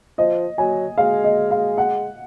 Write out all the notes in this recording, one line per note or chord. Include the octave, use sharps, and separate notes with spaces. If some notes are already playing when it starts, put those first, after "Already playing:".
F3 D#5
F#3 G#5
G#3 F5
D#5
F5
F#5